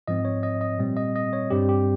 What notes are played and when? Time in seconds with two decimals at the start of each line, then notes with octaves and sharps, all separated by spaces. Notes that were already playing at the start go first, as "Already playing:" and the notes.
0.08 G#2 F3 C4 D#5
0.25 C#5
0.43 D#5
0.61 D#5
0.79 A#2 G3 C4
0.97 D#5
1.16 D#5
1.33 C#5
1.50 G2 G3 C4 G4
1.69 G4